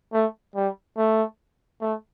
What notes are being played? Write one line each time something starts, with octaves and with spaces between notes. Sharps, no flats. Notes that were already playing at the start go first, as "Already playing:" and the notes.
A3
G3
A3
A3